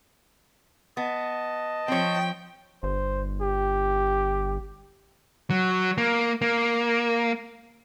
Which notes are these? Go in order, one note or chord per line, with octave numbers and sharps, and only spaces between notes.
B3 D#5 A5
F3 C4 C#5 G5
G1 C5
G4
F#3
A#3
A#3